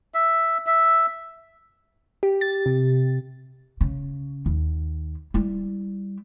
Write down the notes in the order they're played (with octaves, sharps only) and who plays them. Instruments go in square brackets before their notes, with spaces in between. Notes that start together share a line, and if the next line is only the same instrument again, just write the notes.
[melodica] E5
E5
[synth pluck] G4
A6
C3
[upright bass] C#3
D#2
G3 E4